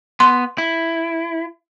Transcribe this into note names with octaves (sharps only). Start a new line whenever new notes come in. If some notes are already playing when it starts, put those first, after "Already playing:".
B3 C6
E4